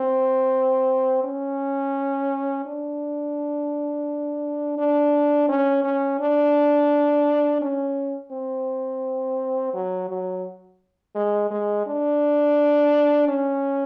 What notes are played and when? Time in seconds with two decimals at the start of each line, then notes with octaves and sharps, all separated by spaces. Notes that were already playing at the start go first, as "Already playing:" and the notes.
Already playing: C4
1.24 C#4
2.65 D4
4.78 D4
5.49 C#4
5.84 C#4
6.20 D4
7.61 C#4
8.32 C4
9.73 F#3
10.09 F#3
11.15 G#3
11.51 G#3
11.86 D4
13.28 C#4